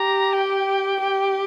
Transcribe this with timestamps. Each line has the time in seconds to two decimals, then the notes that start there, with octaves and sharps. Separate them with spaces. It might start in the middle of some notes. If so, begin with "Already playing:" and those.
Already playing: G4 A#5
0.33 G5
1.00 G4